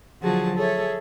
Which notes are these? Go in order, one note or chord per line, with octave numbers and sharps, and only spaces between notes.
D3 F3 F#3 F#4 G#4 A5
G#4 A4 C#5 E5